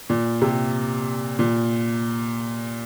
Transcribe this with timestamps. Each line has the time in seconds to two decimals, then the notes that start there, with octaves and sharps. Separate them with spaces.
0.10 A#2
0.42 C3
1.39 A#2